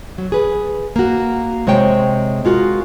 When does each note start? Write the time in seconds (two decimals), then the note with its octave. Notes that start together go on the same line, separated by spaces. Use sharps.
0.18 F#3
0.32 G#4 B4
0.96 A#3 F#4
1.67 C3 G#3 C5 C#5 G5
2.45 G#3 F4 F#4 A#4